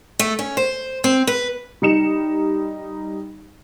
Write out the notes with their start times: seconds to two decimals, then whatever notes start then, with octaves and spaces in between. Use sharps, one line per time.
0.19 A3
0.39 C#4
0.57 C5
1.04 C4
1.27 B4
1.82 G3 D#4 C#7 E7